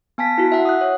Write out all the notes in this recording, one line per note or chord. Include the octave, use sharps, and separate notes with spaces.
B3 G#5 A5 B6
E4 F#4
E5 F#5
D#6 F#6
C#5